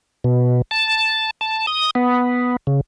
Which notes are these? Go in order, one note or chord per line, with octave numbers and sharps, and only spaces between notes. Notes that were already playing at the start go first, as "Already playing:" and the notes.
B2
A5
A5
D#6
B3
C#3